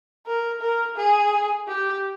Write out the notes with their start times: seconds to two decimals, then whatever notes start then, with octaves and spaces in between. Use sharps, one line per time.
0.26 A#4
0.61 A#4
0.96 G#4
1.68 G4